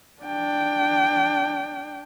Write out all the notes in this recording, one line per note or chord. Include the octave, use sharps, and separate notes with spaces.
D4 G5